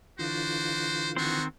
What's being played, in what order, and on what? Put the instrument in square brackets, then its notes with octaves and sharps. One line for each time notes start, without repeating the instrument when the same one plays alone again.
[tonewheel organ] D3 E3 F4 [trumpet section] D4 F#4 C5
[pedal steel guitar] D#3 C4 C5 [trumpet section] G#3 B3 F#4